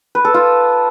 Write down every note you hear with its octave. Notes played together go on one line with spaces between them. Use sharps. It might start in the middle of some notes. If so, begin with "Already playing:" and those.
B4
A4
F4